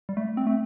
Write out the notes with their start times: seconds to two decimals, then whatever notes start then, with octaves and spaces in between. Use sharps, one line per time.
0.09 G3
0.17 A3
0.37 C4
0.47 A3